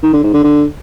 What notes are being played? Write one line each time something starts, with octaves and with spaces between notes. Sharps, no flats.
D#3
D3
G#2
D3
D3